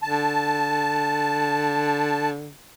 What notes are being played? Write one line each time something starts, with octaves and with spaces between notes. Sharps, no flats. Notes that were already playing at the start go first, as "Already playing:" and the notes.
D3 A5